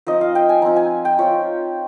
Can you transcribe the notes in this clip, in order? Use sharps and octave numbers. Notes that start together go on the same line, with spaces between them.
F3 C4 D#4 D#5
F5
G5
G#5
F3 C4 D#4 A#5
G#5
G5
F3 C4 F4 C#5